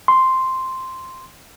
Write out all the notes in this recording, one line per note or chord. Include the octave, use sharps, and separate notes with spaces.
C6